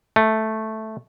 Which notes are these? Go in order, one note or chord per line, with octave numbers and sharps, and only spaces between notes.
A3